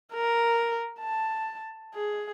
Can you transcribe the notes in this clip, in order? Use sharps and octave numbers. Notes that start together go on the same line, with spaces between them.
A#4
A5
G#4